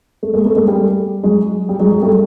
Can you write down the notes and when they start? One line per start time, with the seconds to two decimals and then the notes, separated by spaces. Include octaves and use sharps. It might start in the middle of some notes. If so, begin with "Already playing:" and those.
0.23 A3
0.33 G#3 A#3
0.45 A3 B3
0.56 G#3 A#3
0.68 G3 A3
1.23 F#3 G#3
1.69 G3
1.79 F#3 G#3
1.91 F#3 G#3
2.02 G3 A3